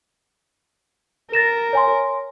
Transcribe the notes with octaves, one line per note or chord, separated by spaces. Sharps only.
A#4 A6 A#6 E7
C#5 G#5 C6